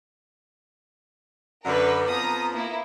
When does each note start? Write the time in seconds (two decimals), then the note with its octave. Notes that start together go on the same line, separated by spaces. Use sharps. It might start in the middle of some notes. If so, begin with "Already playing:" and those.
1.65 F#2 D3 A#4 B4
2.08 F2 F3 B3 A#5 D#6
2.53 A#3 E4